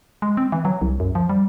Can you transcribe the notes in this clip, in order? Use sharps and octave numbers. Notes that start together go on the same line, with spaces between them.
G#3
C4
E3
F#3
C2
F#2
F3
G3